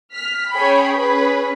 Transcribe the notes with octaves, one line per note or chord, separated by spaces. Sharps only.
F6 B6
C#4 G#4 C#5 G5 B5
C#4 G#4 B4 B5